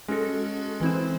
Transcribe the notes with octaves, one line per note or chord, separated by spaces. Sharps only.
G#3 C#4 F#4 A4
E3 C4 E4 C5